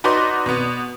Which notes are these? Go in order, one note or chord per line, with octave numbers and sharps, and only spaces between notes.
D#4 F#4 B4 D5 C6
B2 B3